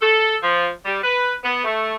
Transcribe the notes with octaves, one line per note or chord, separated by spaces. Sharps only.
A4
F3
G3
B4
B3
A3